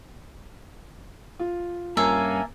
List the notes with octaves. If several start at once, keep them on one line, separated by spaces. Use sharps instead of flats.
F4
G2 A#3 C#4 E5 G#5 A5